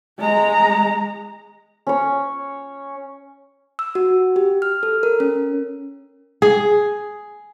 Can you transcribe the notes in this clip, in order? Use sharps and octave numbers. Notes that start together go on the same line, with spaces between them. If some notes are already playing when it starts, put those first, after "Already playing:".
G#3 A#5
C#4 C#5
E6
F#4
G4
F6
A4
A#4
C#4
G#4